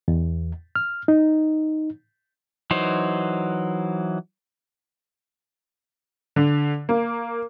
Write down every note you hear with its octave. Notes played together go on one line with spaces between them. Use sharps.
E2
F6
D#4
E3 F#3 D#4 C5
D3
A#3